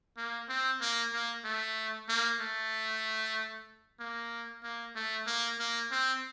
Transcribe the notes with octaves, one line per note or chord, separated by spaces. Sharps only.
A#3
C4
A#3
A#3
A3
A#3
A3
A#3
A#3
A3
A#3
A#3
C4